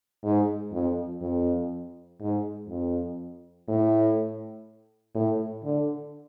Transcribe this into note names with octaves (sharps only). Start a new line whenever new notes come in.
G#2
F2
F2
G#2
F2
A2
A2
D3